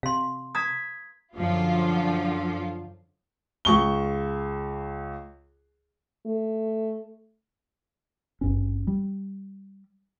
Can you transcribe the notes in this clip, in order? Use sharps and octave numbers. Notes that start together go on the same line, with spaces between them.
C3 F5 C6
A#5 D#6 G#6 B6
F#2 D3 F3 F4
C#2 C#6 G7
A3
G#1 G2 C#4
G3